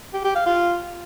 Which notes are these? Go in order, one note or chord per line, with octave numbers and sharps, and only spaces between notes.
G4
G4
F5
F4